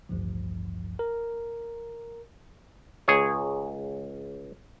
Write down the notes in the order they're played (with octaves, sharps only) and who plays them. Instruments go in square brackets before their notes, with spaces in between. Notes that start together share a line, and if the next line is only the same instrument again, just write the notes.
[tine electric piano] A1 D2 G2 F3
A#4
[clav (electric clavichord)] C#2 G#4 C#5